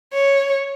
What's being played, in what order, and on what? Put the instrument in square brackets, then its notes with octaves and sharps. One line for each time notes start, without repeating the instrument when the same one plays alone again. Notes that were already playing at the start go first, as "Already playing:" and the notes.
[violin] C#5